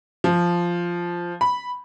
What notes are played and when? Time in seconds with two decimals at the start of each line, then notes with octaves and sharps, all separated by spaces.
0.24 F3
1.41 B5